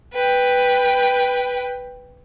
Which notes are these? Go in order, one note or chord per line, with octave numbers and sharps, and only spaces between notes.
B4 G5